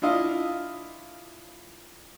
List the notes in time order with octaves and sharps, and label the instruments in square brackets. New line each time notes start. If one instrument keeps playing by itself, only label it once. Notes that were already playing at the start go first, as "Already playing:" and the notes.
[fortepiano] D4 E4 F4 D#5 F5